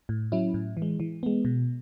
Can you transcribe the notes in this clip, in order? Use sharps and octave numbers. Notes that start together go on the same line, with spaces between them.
A2
F#3 C#4 E4
A2
E3
G#3
E3
G#3 B3
B2